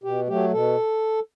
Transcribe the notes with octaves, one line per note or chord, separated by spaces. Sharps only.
B2 G4
F#3 A3 G4
B2 A4